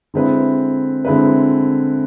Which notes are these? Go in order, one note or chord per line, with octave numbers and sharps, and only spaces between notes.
D3 G#3 C4 E4 B4
D3 G#3 C4 E4 B4